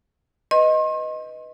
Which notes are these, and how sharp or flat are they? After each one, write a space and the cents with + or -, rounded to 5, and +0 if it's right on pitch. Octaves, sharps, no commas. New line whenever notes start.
B4 +0 D#5 +0 C6 +40